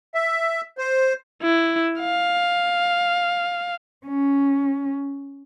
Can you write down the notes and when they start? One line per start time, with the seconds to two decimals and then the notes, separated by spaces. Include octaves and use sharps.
0.15 E5
0.78 C5
1.42 E4
2.00 F5
4.06 C#4